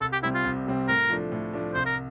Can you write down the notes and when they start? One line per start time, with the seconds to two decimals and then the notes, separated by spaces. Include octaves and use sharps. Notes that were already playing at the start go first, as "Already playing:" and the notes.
0.01 C2 A4
0.12 G4
0.23 C3 G3 C4 E4
0.34 F4
0.45 C2
0.66 C3 G3 C4
0.88 A2 A#4
1.10 F3 A3 D4
1.32 A2
1.53 F3 A3 D4
1.74 C2 C5
1.86 A#4